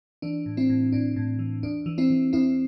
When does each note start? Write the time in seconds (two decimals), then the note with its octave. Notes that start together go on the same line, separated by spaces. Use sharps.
0.22 E3 D4
0.46 A2
0.57 C4 E4
0.69 A2
0.92 A2 D4
1.16 A2
1.39 E3
1.63 E2 D4
1.86 E3
1.98 C4 E4
2.10 E3
2.33 E2 C4 E4